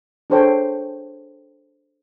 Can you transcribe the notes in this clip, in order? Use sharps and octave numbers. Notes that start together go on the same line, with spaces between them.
D4 G#4 A4 C5 C#5 G5